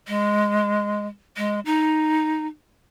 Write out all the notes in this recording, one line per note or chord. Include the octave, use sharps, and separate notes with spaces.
G#3
G#3
D#4